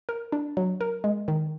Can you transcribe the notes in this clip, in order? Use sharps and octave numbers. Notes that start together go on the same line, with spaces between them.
A#4
D4
F#3
A#4
G#3
D#3